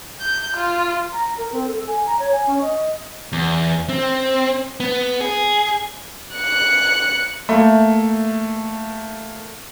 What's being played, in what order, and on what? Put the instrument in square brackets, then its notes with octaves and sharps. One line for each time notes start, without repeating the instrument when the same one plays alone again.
[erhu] G6
F4
[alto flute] A#5
A#4
C4
A4
G#5
A#5
C#5
G#5
C#4
D#5
[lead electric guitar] E2
C4
B3
G#4
[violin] F#6 C#7
[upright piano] A3 A#3